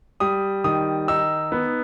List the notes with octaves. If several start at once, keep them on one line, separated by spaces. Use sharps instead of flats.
G3 D#6
D#3 D#6
D#4 E6
B3